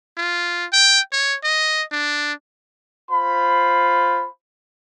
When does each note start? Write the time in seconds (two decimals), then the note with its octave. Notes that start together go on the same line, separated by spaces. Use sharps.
0.18 F4
0.73 G5
1.12 C#5
1.44 D#5
1.92 D4
3.10 F4 C5 B5